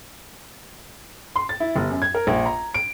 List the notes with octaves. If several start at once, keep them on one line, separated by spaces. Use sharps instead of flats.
C6
A6
E4
G1
F#2
G#6
A#4
A#1
A#5
D7